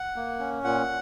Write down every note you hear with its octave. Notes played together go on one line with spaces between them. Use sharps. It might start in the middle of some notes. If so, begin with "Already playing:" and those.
Already playing: F#5
A#3
C#4
A#2 F#5